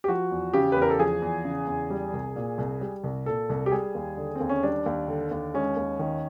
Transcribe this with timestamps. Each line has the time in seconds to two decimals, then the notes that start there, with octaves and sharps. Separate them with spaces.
0.04 G4
0.08 F3 F#4
0.31 E2
0.53 C#3 G4
0.72 B4
0.76 E2
0.82 A#4
0.90 A4
0.99 F3 G#4
1.22 E2
1.45 C#3
1.67 E2
1.90 G3
2.13 C2
2.36 A#2
2.58 C2
2.81 G3
3.04 C2
3.26 A#2 A4
3.50 C2
3.66 G4
3.72 G3 G#4
3.95 D#2
4.17 D3
4.35 D#2 C4
4.49 C#4
4.63 G3 D4
4.86 D#2
5.08 D3
5.31 D#2
5.54 G#3 C#4
5.76 D#2
5.99 D#3